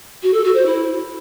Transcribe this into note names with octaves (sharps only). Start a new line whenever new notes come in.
F#4
A4
F#4
C5
E4